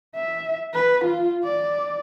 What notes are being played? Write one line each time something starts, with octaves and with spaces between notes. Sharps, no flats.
E5
B4
F4
D5